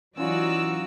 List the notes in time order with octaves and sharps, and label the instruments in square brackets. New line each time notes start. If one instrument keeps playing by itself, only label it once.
[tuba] E3 [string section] F#3 E6 [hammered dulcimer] C#4 F4 [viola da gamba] D#4 F#4 D5